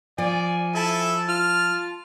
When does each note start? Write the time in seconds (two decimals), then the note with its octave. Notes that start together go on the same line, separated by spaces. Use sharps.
0.18 F3 D5 G#5
0.75 E4 A4 E5 A5
1.29 F4 F6